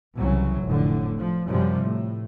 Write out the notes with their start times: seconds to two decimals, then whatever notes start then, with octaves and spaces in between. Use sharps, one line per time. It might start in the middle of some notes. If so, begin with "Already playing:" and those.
0.17 C2 C#3 E3 F#3
0.64 F1 A2 D3
1.17 F3
1.47 F#2 C3 F3 G3
1.82 A2